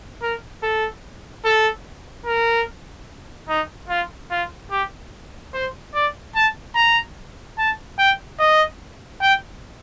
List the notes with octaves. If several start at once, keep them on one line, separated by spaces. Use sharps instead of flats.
A#4
A4
A4
A#4
D#4
F4
F4
G4
C5
D5
A5
A#5
A5
G5
D#5
G5